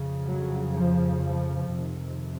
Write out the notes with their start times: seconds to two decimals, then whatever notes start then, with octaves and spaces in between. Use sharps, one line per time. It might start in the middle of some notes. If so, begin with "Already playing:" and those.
Already playing: F2 C#3
0.25 F#3
0.76 F3
1.25 F3
1.74 F2 C3 D#3